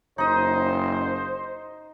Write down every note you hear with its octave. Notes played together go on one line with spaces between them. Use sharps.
F#1 D#4 C5 D#5